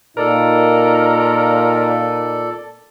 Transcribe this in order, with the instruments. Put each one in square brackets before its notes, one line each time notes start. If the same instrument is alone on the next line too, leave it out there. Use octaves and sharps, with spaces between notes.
[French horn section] A#2 [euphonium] D#4 [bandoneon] A4 D5 [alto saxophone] A#4